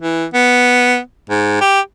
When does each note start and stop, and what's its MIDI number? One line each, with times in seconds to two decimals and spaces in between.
0.01 0.25 52
0.34 0.98 59
1.30 1.57 44
1.61 1.81 67